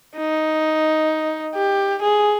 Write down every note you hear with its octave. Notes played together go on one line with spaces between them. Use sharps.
D#4
G4
G#4